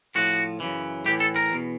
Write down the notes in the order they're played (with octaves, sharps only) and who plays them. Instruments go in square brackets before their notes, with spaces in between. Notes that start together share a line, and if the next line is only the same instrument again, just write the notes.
[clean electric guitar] A2 F3 F#4
F#2 C#3 E3
A2 E3 G4
A4
A#4
E2 B2